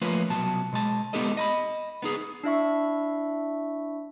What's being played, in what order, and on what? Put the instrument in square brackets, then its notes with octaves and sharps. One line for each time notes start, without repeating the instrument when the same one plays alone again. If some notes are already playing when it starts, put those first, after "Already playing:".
[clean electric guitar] F3 A3 A#3 C#4 F4 B4
C2 B2 F#3 A5
B2 G#3 A5
G#3 B3 D#4 G4 A4 D#5
D#5 A#5 B5
B3 D#4 G#4
[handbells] D4 E4 E5 C#6